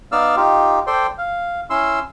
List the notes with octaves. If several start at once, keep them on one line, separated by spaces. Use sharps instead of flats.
B3 D#4 D5 F5 E6 F6
D#4 F4 G4
A4 C5 D5 G5 C6
F5
C#4 E4 C6 E6